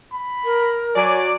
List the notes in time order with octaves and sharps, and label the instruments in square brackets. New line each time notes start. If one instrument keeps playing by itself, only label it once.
[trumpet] B5
[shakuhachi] A#4
[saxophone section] F#3 D5 [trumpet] G#5